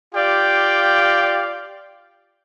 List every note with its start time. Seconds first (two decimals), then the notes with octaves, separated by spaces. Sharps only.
0.15 F4 G4 D5 F5 G5